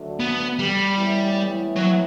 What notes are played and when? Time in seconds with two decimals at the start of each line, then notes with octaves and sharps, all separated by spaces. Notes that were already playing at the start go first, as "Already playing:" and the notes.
Already playing: D2 D3 F#3 A3
0.20 B3
0.59 G3
0.98 A2 E3 B3 E4
1.76 F#3